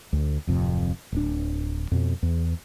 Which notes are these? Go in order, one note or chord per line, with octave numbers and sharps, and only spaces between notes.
D2
D1 F2 C3
D1 D4
F2 B2
E2